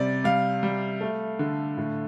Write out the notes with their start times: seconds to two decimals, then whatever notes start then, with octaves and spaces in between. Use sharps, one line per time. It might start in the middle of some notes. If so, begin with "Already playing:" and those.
Already playing: C3 G3 D5
0.24 G3 F5
0.63 G3
1.01 A3
1.39 D3
1.77 A2